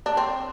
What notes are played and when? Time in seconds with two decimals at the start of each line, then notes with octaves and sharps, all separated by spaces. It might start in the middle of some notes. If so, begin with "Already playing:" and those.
0.06 D4
0.17 C4